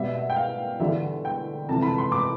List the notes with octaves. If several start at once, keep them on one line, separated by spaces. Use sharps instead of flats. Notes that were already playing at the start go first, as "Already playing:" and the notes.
Already playing: B2 G3 E5
E5
G5
F5
E2 D3 G3 E5
G5
F2 C3 E3 A5
B5
C6
D6